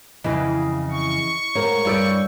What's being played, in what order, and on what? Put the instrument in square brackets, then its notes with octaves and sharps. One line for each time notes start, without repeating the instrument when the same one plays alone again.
[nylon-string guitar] F2 C#3 [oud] E3 [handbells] D#5 A#6
[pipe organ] C#6
[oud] G#2 [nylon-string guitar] A#4 F5 [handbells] C#5
[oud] G2 G4 D5 [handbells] C#5 E6 G6